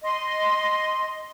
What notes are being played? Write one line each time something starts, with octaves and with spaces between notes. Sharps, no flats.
D#5 C6